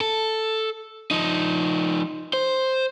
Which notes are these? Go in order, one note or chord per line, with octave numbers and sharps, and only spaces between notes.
A4
F3 D#4
C5